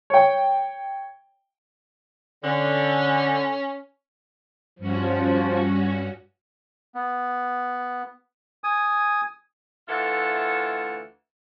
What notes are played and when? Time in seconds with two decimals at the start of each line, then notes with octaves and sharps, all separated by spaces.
0.10 C#5 G5
2.44 D3 C#4
4.79 G2 F3 C#4 F#4
6.95 B3
8.64 G#5 D#6
9.88 D2 E3 F4 A4 E5 F#5